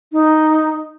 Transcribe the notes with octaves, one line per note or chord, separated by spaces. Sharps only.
D#4